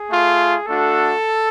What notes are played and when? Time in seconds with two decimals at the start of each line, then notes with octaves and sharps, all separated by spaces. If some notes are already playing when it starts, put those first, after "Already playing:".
Already playing: G#4
0.09 A3 F4
0.66 A3 D4 F#4 A4